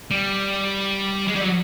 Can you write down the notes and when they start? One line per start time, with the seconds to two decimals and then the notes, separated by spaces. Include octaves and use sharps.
0.11 G3
1.28 G#3
1.35 G3
1.41 F#3